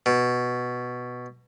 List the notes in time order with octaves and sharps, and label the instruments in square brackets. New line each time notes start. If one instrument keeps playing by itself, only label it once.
[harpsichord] B2